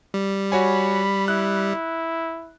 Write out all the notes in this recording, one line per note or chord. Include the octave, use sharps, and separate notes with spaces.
G3
F#4 C#5 G#5 B5
E4 F#6